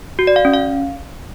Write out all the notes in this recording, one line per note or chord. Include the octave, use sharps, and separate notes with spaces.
F#4
D5
F5
C#4
F5